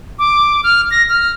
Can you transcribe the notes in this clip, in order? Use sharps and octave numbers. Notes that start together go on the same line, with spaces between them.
D6
F6
A#6
F6